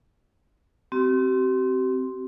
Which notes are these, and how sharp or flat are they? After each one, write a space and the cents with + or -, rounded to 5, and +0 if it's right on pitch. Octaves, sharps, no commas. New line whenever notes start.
C4 +0 G4 -45